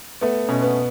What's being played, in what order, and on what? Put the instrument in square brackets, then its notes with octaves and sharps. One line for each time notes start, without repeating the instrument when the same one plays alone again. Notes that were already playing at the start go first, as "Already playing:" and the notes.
[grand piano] A3 B3
B2 C#4
B3